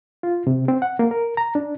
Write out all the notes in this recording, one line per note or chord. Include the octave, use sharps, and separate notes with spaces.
F4
C3
C4
F#5
A#3
A#4
A#5
D4